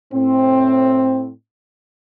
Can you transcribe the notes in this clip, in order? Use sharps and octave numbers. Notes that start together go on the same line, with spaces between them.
A2 C4